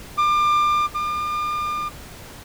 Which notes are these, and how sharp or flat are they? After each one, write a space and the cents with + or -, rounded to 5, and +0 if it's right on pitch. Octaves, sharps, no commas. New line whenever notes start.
D6 +30
D6 +40